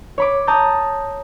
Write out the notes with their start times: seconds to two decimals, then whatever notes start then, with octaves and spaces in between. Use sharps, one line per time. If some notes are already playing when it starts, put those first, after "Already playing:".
0.18 C#5 B5 D6
0.47 A5 A#5 D#6 G6 A6